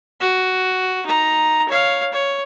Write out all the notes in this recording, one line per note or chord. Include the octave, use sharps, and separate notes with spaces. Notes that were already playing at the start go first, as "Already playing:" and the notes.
F#4
D#4 A#5
C#5 F5
C#5